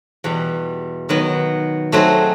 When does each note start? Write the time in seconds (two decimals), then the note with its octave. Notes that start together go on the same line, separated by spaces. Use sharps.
0.24 E2 B2 G3
1.09 D#3 F#3 B3
1.92 F#3 A3 C4 D#4 G#4